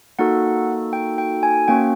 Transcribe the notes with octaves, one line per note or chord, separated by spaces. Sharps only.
A#3 D#4 F#4 A4 F#5
G5
G5
G#5
A#3 C#4 F#4 G5